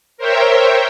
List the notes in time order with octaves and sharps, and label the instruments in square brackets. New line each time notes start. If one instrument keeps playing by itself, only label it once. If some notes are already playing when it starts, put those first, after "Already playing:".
[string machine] A#4 C5 C#5 E5 G5